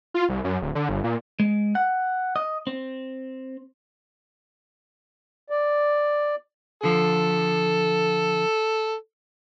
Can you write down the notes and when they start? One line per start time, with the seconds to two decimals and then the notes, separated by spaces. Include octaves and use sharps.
0.14 F4
0.29 C2
0.44 F#2
0.62 D1
0.75 D3
0.89 G1
1.04 A#2
1.40 G#3
1.75 F#5
2.36 D#5
2.67 C4
5.50 D5
6.83 D3 F3 A4